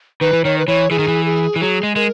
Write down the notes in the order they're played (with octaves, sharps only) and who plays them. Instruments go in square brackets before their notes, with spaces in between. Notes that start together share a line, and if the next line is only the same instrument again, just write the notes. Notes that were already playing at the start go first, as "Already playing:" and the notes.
[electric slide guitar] D#3 [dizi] B4
[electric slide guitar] E3
[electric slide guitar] D#3 [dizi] C#5
[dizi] B4
[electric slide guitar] E3 [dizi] C#5
[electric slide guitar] E3 [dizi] G#4
[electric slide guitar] D#3
E3
[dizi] G#4
[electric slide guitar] E3
[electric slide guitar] F#3 [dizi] G#4
[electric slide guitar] G#3
[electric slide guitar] G#3 [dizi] A#4